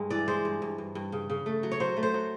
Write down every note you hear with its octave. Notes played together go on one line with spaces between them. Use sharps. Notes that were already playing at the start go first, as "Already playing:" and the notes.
Already playing: G2 G#3
E3 D5
G#3 C5
G2
G2
G2
G2
C#3
C#3
A3
F#3
C#5
F#3 C5
A3
C5
F#3